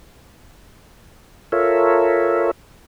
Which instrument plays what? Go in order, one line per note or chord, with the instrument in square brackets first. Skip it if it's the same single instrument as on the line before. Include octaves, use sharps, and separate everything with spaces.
[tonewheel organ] F4 A4 A#4 C#5 E5